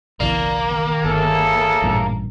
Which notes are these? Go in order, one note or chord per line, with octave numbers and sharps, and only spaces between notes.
F#1 B1 E3 A#3 D5
D#3
G1 A2 G#4 A4
A1 G2 A#2